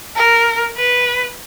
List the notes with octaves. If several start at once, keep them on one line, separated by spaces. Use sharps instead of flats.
A#4
B4